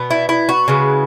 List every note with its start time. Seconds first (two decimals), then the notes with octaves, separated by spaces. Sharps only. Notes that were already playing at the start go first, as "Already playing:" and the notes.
Already playing: B2 B3
0.11 E4
0.29 E4
0.49 F#4
0.68 C#3 E3 G#3 B3